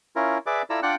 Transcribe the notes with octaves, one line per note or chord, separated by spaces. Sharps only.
C#4 E4 F4 A#4
G#4 B4 D5 E5 D6
E4 F4 A4 D5 A#5 E6
D4 F4 D5 F#5 G5 F#6